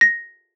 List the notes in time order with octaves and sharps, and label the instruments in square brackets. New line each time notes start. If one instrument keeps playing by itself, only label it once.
[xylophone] A#6